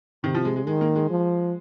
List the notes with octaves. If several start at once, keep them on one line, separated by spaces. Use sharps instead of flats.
C3 D#3
F3
G#3
G#3
D#3 G#3
A#3
G#3
F3